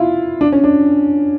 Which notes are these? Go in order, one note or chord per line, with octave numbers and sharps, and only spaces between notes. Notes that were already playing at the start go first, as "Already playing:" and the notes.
Already playing: E4 F4
D4
C#4
D4